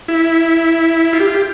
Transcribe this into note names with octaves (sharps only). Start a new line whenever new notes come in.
E4
F4
G4
F4
G4